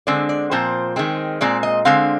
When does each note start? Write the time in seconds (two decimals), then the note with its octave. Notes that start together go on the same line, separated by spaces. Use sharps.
0.07 D3 G#3 C4 D5
0.29 D5
0.51 A#2 F3 C4 C5
0.96 D#3 G#3 C4
1.41 A#2 G#3 C4 D5
1.63 D#5
1.85 D3 G#3 C4 F5